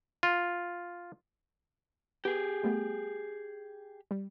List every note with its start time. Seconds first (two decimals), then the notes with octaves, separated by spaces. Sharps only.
0.23 F4
2.25 B3 G4 G#4
2.63 G3 A3 B3
4.11 G3